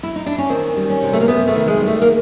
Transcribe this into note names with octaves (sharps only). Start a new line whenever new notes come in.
E4
D#4
D4
C#4
D#3 C4
G3
C#4
C3
A3
A#3
C3 B3
A3
D#3
G#3
G3
A3
A#3